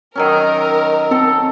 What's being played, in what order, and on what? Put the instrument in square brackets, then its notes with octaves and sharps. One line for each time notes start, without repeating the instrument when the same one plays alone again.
[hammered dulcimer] D#3 F#3 C#4 [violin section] A#4
[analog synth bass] C4 [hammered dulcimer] A4